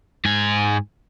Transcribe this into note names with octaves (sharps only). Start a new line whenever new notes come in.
G#2 G#5